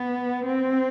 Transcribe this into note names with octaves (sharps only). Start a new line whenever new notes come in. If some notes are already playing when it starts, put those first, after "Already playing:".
Already playing: B3
C4